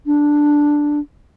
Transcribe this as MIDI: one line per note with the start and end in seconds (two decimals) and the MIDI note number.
0.06 1.00 62